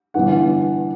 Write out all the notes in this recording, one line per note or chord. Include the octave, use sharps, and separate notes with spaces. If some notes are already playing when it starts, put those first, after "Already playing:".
G1 G2 E3 F#5